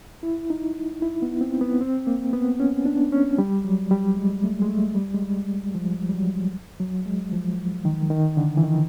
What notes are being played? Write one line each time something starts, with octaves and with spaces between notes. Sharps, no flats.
E4
D#4
E4
B3
C4
B3
C4
A#3
B3
C#4
D4
C#4
G3
F#3
G3
G#3
A3
G#3
A3
G3
G#3
G3
F3
G3
F#3
F#3
G#3
F3
D#3
D#3
D3
E3
D#3